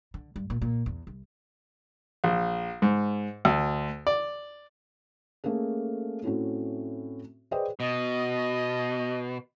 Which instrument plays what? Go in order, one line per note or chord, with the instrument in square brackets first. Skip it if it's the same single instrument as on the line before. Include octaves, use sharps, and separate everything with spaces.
[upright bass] D3
G2
A#2
A#2
E2
C2
[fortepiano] A#1
G#2
D2
D5
[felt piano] A3 A#3 C#4 G#4 A4
A2 A3 C4 C#4 F#4
G#4 B4 C5 D5 D#5 G5
[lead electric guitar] B2 [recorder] D#5